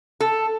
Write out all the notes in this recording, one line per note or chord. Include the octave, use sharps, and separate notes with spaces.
A4